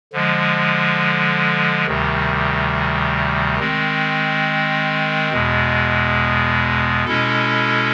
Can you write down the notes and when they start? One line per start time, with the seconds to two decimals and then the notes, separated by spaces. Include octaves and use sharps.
0.13 D3 F3 G#3
1.86 D2 C3 D#3 G3
3.59 D#3 G#3 C4
5.32 E2 B2 G#3
7.06 B2 G#3 C#4 E4 A4